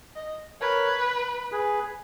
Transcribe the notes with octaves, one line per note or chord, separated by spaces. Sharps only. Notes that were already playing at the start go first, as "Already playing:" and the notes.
D#5
A#4 B4 C#5
G#4 B4